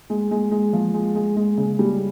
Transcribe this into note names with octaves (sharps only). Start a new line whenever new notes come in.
G#3
G#3
G#3
F3
G#3
G#3
G#3
C#3
G3